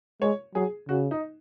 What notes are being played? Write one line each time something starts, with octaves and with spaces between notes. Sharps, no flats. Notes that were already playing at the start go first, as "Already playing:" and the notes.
G#3 C#5
F#3 G#4
C#3 F#4
D#4